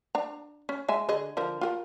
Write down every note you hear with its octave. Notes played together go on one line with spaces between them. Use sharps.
D4 A#5
C#4
G#3 E5 G#5
D3 G#4 D#5
D3 F3 A#4
F4 G4 A#4